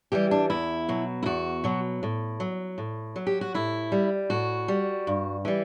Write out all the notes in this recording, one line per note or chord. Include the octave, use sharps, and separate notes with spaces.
E3 G3 G4
D4
E2 E4
B2 F#3
E4
E2 F#4
B2 F#3
A2
F#3
A2
F#3
G4
F#4
A2 E4
G3
A2 F#4
G3
G2
E3 G3